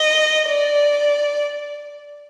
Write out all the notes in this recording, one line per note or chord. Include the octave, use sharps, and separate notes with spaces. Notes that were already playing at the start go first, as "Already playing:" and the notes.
Already playing: D#5
D5